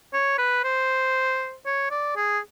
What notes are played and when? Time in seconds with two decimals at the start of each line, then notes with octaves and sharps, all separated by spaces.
0.13 C#5
0.38 B4
0.64 C5
1.66 C#5
1.91 D5
2.16 G#4